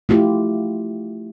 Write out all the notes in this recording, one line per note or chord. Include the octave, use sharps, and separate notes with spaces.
A3 E4 F4 G4